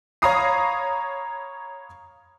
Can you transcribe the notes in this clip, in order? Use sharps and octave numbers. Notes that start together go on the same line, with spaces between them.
C#5 F5 A#5 B5 D#6 C7